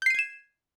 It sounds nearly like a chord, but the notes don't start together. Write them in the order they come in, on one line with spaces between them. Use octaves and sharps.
G6 C7 D#7 G#6 E7